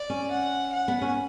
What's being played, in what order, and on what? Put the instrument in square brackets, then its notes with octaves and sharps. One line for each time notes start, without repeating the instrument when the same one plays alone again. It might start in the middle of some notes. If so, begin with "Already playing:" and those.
Already playing: [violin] D5
[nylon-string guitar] C#4
[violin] F#5
F#5
[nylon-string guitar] B3
C#4